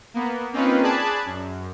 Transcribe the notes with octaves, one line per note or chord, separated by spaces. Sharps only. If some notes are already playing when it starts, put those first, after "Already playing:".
A#3 B3
A#3 C4 C#4 D#4 F4 B4
G#4 D5 A5 B5 F#6 G#6
F#2